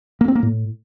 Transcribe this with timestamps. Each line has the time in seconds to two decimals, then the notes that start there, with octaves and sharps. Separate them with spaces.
0.21 A#3
0.28 C4
0.35 A#3
0.43 A2